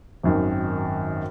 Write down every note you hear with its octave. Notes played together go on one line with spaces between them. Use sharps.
G#1 F#2 D#3